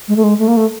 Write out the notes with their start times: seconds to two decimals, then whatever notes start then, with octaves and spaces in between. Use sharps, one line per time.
0.08 G#3
0.17 A3
0.24 G#3
0.39 A3
0.48 A#3
0.57 A3